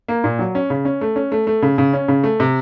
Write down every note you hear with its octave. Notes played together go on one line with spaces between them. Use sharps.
A#3
A#2
F#3
C#4
C#3
C#4
A3
C#4
A3
A3
C#3
C#3
C#4
C#3
A3
C3